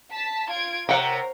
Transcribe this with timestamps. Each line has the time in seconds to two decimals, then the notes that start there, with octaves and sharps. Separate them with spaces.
0.12 A5 B6
0.48 F4 G#6 D7
0.89 C3 A#4 C#5 F#5 G5 A#5